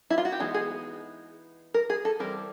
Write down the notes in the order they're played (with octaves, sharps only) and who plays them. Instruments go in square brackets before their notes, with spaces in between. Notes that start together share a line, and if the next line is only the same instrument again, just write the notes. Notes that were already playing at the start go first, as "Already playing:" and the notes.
[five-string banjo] E4
F4
F#4
G4
E3 G#3 B3 D#4 G#4
G#4
A#4
G#4
A4
E3 G3 C4 A#4